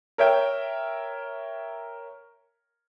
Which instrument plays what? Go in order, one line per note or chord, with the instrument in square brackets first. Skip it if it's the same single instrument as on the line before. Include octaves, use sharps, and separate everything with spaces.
[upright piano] A#4 C#5 E5 G5